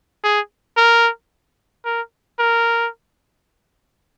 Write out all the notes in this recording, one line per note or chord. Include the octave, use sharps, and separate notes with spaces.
G#4
A#4
A#4
A#4